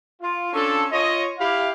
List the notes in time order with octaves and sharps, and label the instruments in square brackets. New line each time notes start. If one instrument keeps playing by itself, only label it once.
[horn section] F4
C#4 D4 F4 A4
F4 C#5 D#5
E4 G4 F5